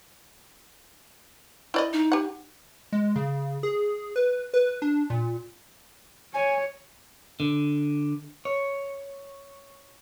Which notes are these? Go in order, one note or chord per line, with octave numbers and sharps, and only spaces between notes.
E4 D5 D#5
D#4
G4 F#5
G#3
C#3
G#4
B4
B4
D4
A#2
C#5 G#5
D3
C#5